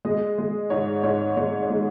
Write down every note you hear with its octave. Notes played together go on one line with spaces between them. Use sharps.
G#3 D#5
G#3
G#2 C#5
G#2 C#5
G#3 C#5
C#5
G#3